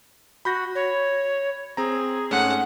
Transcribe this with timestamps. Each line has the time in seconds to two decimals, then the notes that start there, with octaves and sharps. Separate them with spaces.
0.45 F#4 B5 G6 A#6
0.75 C#5
1.77 C4 G#4 A#5
2.31 G#2 A3 C#4 F#5